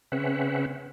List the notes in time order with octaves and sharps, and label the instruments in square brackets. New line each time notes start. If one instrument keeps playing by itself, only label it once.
[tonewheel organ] C#3 C4 C#4 B4 E5 F#5